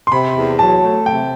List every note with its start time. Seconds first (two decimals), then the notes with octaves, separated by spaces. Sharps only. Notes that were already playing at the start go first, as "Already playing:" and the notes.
0.07 C6
0.12 C3 B5
0.36 E2
0.59 F#3 A5
0.82 A3
1.06 C3 G5